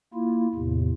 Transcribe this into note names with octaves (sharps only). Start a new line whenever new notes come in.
A#3 E4 F4
E2 A2 C3